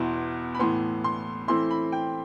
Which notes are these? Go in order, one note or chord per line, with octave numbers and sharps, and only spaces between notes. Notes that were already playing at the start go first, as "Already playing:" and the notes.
Already playing: E2 B2 B3 E4 C6
B5
A2 E3 B3 C6
C6
E3 A3 C4 E4 C6
B5
G5